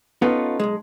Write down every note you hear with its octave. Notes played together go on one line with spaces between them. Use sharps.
B3 C#4 D#4 F4 A4 B4
B1 G#3